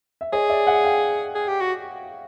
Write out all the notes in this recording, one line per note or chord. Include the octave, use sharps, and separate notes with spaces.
E5
G#4 C#5 D#5
D5 E5
E5 F#5
F5 G5
G#4
G4
F#4